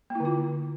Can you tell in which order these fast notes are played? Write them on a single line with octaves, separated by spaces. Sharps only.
A#3 E4 D3 F4